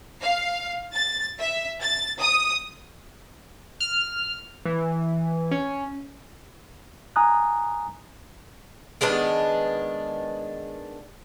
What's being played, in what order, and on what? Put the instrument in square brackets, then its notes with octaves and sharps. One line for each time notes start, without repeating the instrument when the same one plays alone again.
[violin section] F5
A6
E5
A6
D#6
[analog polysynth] F6
E3
C#4
[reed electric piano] G#5 A#5 D#6 F#6
[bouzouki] D#3 G#3 B3 D4